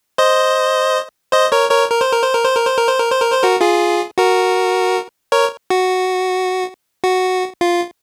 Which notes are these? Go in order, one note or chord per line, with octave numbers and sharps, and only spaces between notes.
C5 D#5
C5 D#5
A#4 C#5
A#4 C#5
A#4
C5
A#4
C5
A#4
C5
A#4
C5
A#4
C5
A#4
C5
A#4
C5
F#4 A#4
F4 G#4
F#4 A#4
A#4 C#5
F#4
F#4
F4